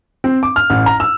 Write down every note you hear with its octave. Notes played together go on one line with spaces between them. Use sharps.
C4
D6
F6
A1
A#5
E6